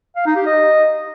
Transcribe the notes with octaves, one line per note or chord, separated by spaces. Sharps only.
F5
D#4
G4
D#5